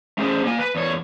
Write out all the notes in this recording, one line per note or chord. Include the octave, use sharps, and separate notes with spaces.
A3 C#4 G#4 C5
A#3 G#5
B4
E2 C#5